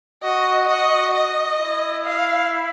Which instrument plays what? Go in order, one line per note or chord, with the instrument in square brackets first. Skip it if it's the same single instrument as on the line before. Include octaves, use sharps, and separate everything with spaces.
[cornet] F#4 [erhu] D#5
[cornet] F#4 [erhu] D#5
[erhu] D#5
[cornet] E4
[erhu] F5